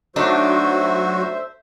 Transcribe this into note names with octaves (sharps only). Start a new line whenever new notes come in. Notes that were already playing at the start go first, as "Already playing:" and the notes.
F#3 A3 D4 D#4 F#4 C5 E5